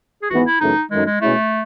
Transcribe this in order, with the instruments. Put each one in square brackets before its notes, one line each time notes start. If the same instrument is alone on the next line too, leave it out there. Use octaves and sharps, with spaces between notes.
[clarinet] G#4
[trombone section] G#1 G#2 E3 B3 [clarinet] F#4
[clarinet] E4
[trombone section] F#2 C#3 E3 A3 [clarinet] D#4
[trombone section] F#2 D#3 A3 D#4 [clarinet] G#3
[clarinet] G#3
[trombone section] B2 G#3 C#4 E4 [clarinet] A3